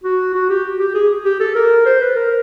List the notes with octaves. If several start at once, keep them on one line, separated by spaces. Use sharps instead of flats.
F#4
F#4
G4
G4
G#4
G4
A4
A#4
C5
B4
A#4